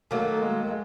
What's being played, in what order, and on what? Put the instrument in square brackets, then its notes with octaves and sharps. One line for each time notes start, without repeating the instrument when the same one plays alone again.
[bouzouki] D#3 F#3 A#3 [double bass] A3
[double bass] G#3